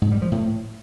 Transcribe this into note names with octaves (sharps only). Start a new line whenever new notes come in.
G#2
G3
F3
A2